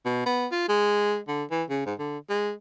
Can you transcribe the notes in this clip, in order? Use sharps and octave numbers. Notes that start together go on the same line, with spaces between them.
B2
B3
F4
G#3
D3
E3
C#3
G#2
D3
G#3